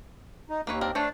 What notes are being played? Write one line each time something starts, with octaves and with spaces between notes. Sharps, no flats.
D#4
D#2 A#3 B4 C#5
C4 D4 A#4
A3 D4 C5 C#5